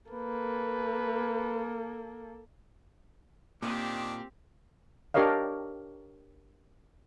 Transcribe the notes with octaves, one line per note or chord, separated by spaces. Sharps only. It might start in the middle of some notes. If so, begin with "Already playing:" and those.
A#3 A4 B4
A#2 D#3 C4 D4 G4
D4 G4 A#4 C#5 D#5 F5